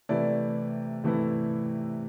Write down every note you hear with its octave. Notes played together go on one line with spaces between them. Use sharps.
C3 E3 A3 E4 D5
C3 E3 A3 E4